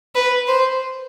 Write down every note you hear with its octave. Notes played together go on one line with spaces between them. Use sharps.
B4
C5